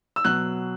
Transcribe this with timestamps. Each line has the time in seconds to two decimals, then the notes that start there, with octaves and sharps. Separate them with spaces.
0.16 E6
0.25 B2 F#3 F#6